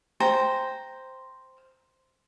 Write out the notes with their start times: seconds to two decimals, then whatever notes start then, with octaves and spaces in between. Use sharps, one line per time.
0.20 C5 G5 A#5